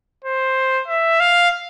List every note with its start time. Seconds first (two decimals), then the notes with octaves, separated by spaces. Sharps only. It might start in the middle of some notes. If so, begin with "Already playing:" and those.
0.24 C5
0.88 E5
1.20 F5